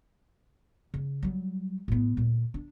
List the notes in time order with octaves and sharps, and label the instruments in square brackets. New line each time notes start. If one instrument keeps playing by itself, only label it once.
[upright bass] C#3
F#3 G3
A2 B3
D2 A#2
D4